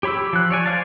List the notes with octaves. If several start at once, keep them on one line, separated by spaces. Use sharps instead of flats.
G4 C#5 B5 D6 E6
F3 F#6
C#5 D5 G#5
C5 D5 F5 A5